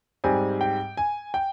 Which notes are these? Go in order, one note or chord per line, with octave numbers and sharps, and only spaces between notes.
G#2 G3 C4 G#5
G5
G#5
G5